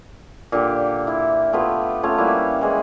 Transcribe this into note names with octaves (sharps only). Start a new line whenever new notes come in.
A#2 D3 G4
E4
A3 B3 F4 G4
A3 C#4 F4 C#5
G3 A#3 E4 B4
E3 G#3